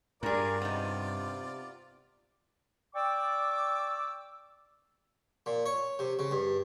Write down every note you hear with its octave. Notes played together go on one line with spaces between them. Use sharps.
G2 D4 F4 G#4 A#4 D5
C3 B3 D#4
D5 G5 C#6 D6 E6
A#2
C#5
C3
C#3
G2